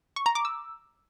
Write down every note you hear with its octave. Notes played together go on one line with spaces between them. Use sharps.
C#6
A#5
D6
E6